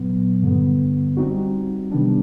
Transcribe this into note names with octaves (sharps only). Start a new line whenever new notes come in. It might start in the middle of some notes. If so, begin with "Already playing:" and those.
Already playing: A#2 F#3 B3
G2 D3 G3 B3
G3 C4 D#4 F#4
C3 D#3 G3 B3 D4